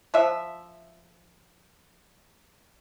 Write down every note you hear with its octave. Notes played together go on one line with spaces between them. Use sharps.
F3 E5